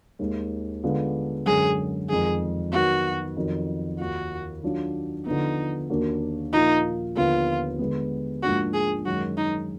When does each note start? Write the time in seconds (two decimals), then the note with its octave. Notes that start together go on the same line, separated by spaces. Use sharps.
0.19 D#2 D#3 G#3
0.83 D3 G#3 B3 D4 F4
1.46 F#2 D3 G#3 G#4
2.09 F2 D#3 G#3 G#4
2.73 D#3 F#3 B3 F#4
3.37 F2 D#3 F#3
3.99 D#2 D#3 A#3 F4 F#4
4.63 D#3 F#3 D4 F4
5.26 D3 F3 B3 D#4
5.90 D#2 D#3 A#3 D4 F#4
6.53 A#2 F3 A#3 D#4 F4
7.16 D#2 D3 F3 B3 F4
7.79 D3 G#3 B3
8.43 G#2 F3 A#3 D4 F#4
8.74 G#4
9.06 F#2 D#3 G#3 F#4
9.38 D#4